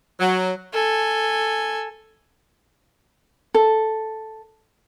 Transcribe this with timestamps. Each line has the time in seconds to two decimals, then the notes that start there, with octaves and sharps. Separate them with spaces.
0.20 F#3
0.73 A4 G#5
3.54 A4